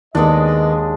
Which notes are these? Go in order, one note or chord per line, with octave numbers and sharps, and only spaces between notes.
D#2 D#3 G#3 B3 D4 D#5